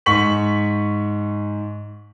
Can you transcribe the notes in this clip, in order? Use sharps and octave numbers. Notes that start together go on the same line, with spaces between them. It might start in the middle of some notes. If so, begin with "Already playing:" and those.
G#2 C#6 B6 F#7